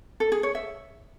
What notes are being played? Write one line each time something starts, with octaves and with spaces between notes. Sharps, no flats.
A4
G#4
C#5
E5